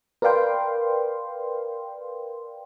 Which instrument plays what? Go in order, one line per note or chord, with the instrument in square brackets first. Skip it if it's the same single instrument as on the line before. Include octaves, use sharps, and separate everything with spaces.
[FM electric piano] A#4 B4 D5 F5 G5 C6